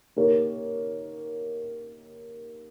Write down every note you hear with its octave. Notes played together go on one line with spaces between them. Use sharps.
A#3 D#4 G4 A#4 C#5